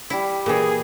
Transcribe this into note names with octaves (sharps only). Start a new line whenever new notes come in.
G3 E4
A#2 E3 G#4